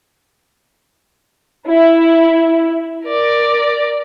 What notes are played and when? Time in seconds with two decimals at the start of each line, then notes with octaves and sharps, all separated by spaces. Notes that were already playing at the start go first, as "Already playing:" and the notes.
1.68 E4
3.07 A#4 D5